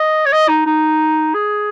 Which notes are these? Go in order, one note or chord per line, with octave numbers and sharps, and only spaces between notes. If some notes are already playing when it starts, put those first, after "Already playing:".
Already playing: D#5
C#5
D#5
D#4
D#4
G#4